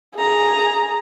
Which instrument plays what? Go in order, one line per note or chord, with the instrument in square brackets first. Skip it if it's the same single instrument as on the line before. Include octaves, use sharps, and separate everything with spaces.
[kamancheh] G#4 A#5